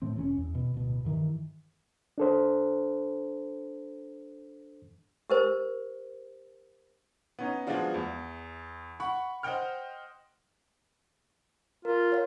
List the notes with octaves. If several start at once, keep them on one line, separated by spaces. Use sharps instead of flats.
A2 E3 C4
E1 C3 C#4
E2
B2
D1 B2
G2 D#3 E3
D4 A4 C5
G4 A#4 C5
B3 C#4 D#4
F3 G#3 B3 D4 F4 F#4
E2
F#5 B5 C#6
C5 D#5 F#5 G5 F6
F4 A#4
C#5 F5